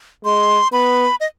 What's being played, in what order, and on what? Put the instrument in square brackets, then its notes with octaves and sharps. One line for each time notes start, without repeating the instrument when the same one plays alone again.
[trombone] G#3 [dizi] C6
[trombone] B3 [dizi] B5
[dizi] D#5